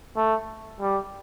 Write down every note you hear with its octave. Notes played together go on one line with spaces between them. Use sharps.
A3
G3